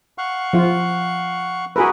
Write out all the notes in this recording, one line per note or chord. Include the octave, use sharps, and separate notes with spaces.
F5 F#5 C#6
F3 F4
F#4 G#4 A#4 B4 E5